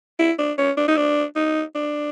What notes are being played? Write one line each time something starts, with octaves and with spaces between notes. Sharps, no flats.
E4
D4
C#4
D4
D#4
D4
D#4
D4